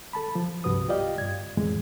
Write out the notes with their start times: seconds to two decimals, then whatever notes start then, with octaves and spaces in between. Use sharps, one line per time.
0.13 A4 A5 B5
0.35 F3
0.64 C2 G2 F#4 B4 D#6
0.88 F4 G4 D5 D#5 F5 G5
1.18 G2 G#6
1.57 F2 A2 E3 G#3